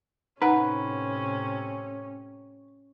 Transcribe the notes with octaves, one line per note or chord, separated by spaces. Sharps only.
A2 C3 C#4 D#4 B4 F#5 A#5